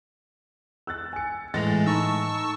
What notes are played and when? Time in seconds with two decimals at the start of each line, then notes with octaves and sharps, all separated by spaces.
0.87 E6 F#6 A6
1.13 G#5 C#7
1.54 A2 E3 G#3 G#5 A6 A#6 F7
1.86 D#4 A5 C#6 E6